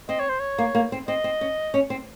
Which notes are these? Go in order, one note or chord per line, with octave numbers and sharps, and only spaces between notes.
C4 D#5
C#5
C5
C#5
A#3
A#3
C4
C4 D#5
C4
C#4
C#4
C4